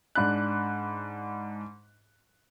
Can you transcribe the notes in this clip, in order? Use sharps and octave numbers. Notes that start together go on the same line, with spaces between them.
G#2 D4 B5 F#6